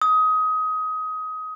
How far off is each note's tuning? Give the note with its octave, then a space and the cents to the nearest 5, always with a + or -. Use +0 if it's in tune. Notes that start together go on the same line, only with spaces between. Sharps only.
D#6 +20